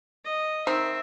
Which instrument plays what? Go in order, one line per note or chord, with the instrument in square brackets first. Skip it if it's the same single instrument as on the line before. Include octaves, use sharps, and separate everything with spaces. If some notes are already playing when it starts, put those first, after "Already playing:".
[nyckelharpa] D#5
[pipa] D#3 C4 [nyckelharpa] E5